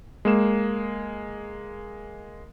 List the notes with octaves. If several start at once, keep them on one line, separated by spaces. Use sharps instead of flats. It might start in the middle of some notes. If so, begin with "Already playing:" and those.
G#3 A#3 E7